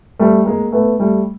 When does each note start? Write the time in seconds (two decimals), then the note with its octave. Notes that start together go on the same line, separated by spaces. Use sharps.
0.19 G3 A3
0.46 G#3 A#3
0.72 A3 B3
0.99 G3 A3